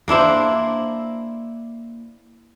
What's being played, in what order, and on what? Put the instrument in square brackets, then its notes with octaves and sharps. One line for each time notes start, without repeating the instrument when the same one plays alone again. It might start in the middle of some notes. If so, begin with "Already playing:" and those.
[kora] A#3 D4 E4 C5